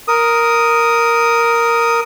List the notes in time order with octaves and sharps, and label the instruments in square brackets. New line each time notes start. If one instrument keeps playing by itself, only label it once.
[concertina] A#4 D#6